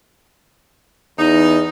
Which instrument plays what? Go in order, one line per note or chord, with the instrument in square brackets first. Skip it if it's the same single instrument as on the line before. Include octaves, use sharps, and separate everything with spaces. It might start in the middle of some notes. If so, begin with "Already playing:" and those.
[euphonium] E2 [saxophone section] D#4